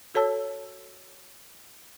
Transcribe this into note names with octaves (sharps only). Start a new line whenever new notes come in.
F#4 A4 C#5 A5 E6